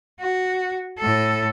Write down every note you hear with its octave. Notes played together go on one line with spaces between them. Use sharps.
F#4
A2 A4